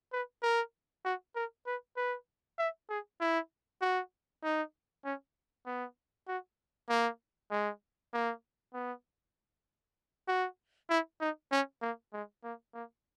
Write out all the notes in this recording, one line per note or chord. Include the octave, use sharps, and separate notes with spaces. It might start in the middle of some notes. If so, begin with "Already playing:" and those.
B4
A#4
F#4
A#4
B4
B4
E5
G#4
E4
F#4
D#4
C#4
B3
F#4
A#3
G#3
A#3
B3
F#4
E4
D#4
C#4
A#3
G#3
A#3
A#3